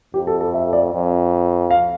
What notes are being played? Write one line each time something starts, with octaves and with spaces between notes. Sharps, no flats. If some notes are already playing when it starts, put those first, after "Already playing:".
F2 G4
A4
A4
E5
D5
F2
F5